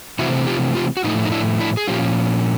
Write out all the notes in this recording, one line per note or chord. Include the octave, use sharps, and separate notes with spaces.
C3 E3 A3 C4 E4 F#4
F4 G4
F4 G4
F#4
A2 F3 A3 D#4 F4
D#4
D4 E4
D4 E4
G#4
A#2 F3 A#3 C#4 F4 G4